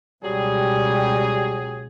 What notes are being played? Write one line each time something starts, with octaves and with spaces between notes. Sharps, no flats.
C#2 B2 F#3 G3 G4 G#4